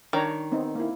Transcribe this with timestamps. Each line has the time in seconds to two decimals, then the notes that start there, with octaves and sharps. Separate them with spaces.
0.13 D#3 D4 C#5 A#5
0.52 B3 C4 D#4
0.75 A#3 E4